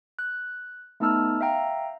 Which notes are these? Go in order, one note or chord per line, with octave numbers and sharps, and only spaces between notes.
F#6
A3 B3 D#4 A5 E6 F6
E5 F5 G5 A#5